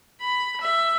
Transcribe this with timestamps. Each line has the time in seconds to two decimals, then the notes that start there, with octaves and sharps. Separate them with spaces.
0.22 B5
0.61 E5